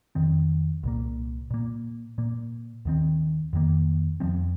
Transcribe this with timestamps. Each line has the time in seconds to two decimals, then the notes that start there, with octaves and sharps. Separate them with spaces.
0.15 F2 D#3 C4
0.83 C2 A#2 A#3
1.50 A#2 A#3
2.18 A#2 A#3
2.85 D#2 D#3 C4
3.53 F2 D#3 A#3
4.20 F2 F3 G#3 C4